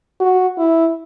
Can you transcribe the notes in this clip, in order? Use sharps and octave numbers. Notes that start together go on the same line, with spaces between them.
F#4
E4